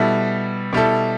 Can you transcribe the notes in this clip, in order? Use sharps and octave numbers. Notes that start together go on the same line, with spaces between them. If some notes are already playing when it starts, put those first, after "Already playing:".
Already playing: B2 G3 E4 A4
B2 G3 E4 A4